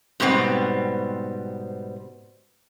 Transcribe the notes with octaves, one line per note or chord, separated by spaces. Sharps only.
G#2 B2 G3 B3 C4